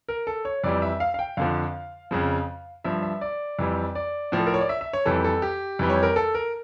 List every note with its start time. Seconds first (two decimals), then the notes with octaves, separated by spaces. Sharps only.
0.08 A#4
0.27 A4
0.45 C#5
0.64 F2 E3 G3 D5
0.82 E5
1.00 F5
1.14 F5
1.19 G5
1.37 F2 D3 F3 F5
2.11 F2 C#3 F3
2.84 G2 F3 E5
3.03 E5
3.21 D5
3.59 F2 E3 G3
3.95 D5
4.32 A2 F3
4.39 A4
4.47 A#4
4.54 C#5
4.61 D5
4.69 E5
4.81 E5
4.93 C#5
5.06 F2 E3 G3 A4
5.24 A4
5.42 G4
5.79 F2 E3 G3
5.90 C#5
6.03 A#4
6.16 A4
6.35 A#4